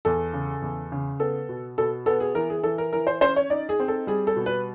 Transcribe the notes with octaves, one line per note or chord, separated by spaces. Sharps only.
E2 A4
C#3
E2
C#3
B3 A4
B2
B2 A4
B3 A4
G#4
E3 A#4
G#4
E3 A4
A#4
E3 A#4
C5
C#4 C5
C#5
D#4 D5
G#4
C4
A4
G3 G#4
A4
B2
B4